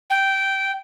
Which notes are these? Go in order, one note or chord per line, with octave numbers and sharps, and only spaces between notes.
G5